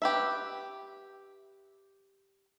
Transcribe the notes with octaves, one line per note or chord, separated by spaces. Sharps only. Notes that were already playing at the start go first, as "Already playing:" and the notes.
G4 B4 E5